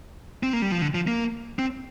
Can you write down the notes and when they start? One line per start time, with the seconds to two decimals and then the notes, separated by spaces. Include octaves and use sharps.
0.43 C4
0.53 A#3
0.62 G3
0.72 F3
0.82 D3
0.94 F3
1.07 A#3
1.59 C4